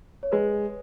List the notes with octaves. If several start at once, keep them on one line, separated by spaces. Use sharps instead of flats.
C#5
G#3 B4